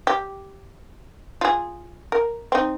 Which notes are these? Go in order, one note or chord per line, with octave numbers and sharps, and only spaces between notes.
G4
F4 G#4
A#4
C4 D#4